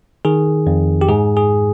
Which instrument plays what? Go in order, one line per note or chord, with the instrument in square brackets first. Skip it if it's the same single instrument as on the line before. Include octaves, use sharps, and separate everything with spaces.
[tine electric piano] D#3 G#4
F2
G4
G#2 G#4
G#4